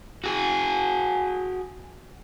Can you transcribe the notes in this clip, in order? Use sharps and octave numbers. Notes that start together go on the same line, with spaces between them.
F#4 G#4